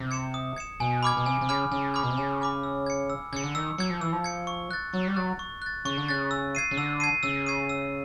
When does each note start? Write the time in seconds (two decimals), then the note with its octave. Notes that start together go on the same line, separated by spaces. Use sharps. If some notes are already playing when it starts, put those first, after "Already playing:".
Already playing: C3
0.11 G#6 C#7 E7
0.34 D#6
0.56 G#6 C#7 E7
0.80 B2 G#5
1.03 B5 D6 F6 G#6
1.17 B2
1.26 C3 G#5
1.41 C3
1.49 C#3 B5 D6 F6 G#6
1.71 C#3 G#5
1.94 B5 D6 F6 G#6
2.03 B2
2.10 C3
2.17 C#3 G#5
2.41 B5 D6 F6 G#6
2.63 E6
2.86 G#6 C#7
3.10 E6
3.33 C#3 G#6 C#7
3.44 D3
3.55 D#3 E6
3.78 F#3 G#6 C#7
3.90 F3
4.01 E3 E6
4.12 F3
4.24 G#6 C#7
4.47 C#6
4.71 F#6 A6
4.93 F#3 C#6
5.07 G3
5.16 F#3 F#6 A6
5.39 C#6
5.62 F#6 A6
5.85 C#3 C#6
5.97 D3
6.08 C#3 F#6 A6
6.31 E6
6.55 G#6 C7 D#7
6.71 C#3
6.77 D3 E6
7.00 G#6 C7 D#7
7.23 C#3 E6
7.46 G#6 C7 D#7
7.69 E6